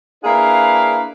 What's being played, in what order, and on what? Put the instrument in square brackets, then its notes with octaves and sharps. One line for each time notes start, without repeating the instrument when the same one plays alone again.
[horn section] A#3 D4 E4 G#4 B4 F5